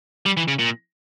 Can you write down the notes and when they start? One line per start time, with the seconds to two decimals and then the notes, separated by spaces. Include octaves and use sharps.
0.26 G3
0.37 E3
0.48 C#3
0.59 A#2